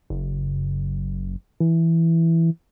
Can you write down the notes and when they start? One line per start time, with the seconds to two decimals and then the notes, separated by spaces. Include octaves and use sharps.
0.10 F#1
1.60 E3